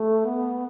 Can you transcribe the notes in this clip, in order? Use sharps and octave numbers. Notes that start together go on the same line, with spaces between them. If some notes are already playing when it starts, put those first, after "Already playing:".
Already playing: A3
B3